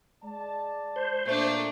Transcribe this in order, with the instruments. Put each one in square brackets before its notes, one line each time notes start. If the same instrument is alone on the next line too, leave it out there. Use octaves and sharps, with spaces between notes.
[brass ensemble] G#3 D5 A5
[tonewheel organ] C5
[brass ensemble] A#2 [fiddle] A3 D4